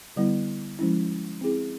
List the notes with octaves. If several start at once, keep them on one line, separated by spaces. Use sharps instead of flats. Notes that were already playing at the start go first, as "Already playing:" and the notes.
D3 G3 B3 E4
F3 G#3 C#4 E4
C4 E4 G#4